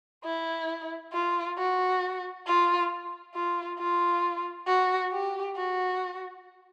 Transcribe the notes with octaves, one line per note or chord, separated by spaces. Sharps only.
E4
F4
F#4
F4
F4
F4
F#4
G4
F#4